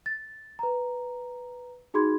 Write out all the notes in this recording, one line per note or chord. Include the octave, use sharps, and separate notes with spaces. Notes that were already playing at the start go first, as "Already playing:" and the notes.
A6
B4 A#5
D#4 F#4 G#4 B5 C6 G#6